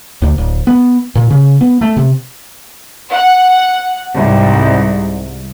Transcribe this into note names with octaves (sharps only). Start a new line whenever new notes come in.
D2
D1
B3
A#2
C#3
B3
A3
C3
F#5
C2 G#2